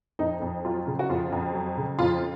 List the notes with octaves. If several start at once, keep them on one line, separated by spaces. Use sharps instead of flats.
F2 D#4
F2
F#3 F4
C#3
F#4
F2 F4
F2
F#3
C#3
F2 F4